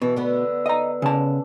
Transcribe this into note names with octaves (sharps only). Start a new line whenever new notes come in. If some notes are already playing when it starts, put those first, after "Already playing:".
B2 E3
D3 B3
D#5 A#5
C#3 A5